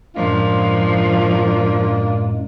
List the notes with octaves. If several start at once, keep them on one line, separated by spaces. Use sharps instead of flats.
F#2 A2 F3 G#3 A#3 D4 F4